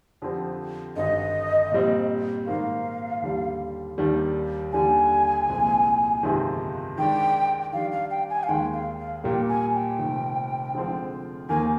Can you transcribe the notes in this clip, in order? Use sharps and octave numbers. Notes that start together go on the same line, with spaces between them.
F2 D3 F3 C4 G4
G#1 G2 D3 D#5
A#2 G3 C4
G#2 D#3 A#3 F5
D#2 D3 G3
D#2 D#3 G3 D4
D#2 D3 G3 D4 G4 G#5
C2 A#2 F3 G#3 C4
G1 F2 C3 D#3 G#3
D#3 G#3 D4 G5
D#3 G3 D4 F5
F5
G5
G#5
F5
D#2 D#3 G#3 G5
F5
F5
A#2 G3 A#3 G5
G#5
G5
F1 F2 D#3
D3 F3 G#3 C4 F4
D#2 D#3 A#3 G#5